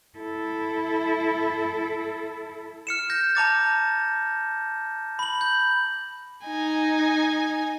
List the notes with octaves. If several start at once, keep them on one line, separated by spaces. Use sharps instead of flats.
E4 A4
F6 C#7 E7
G6 A#6
A5 A#5 D6 A6
B5 F#7
G6
D#4 G#5